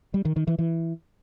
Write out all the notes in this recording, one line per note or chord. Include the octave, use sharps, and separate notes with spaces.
G3
D#3
D#3
E3
E3